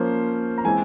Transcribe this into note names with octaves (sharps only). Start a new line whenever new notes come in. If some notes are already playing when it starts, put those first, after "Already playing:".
Already playing: F3 A#3 C#4 C5
A#5
E3 G#3 C4 G#5